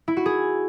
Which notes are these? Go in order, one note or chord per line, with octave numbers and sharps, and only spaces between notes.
E4
F#4
G#4